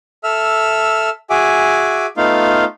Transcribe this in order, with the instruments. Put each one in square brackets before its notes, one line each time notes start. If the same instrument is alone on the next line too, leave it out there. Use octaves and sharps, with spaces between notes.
[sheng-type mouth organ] A4 E5 E6 F6
F#4 G#4 E5 G#5 D6
A3 B3 D#4 F4 F5